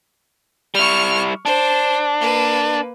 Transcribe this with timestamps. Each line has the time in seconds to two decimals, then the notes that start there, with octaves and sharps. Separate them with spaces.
0.75 G3 E4 C#6 F6
1.45 D4 C5
2.20 A#3 B4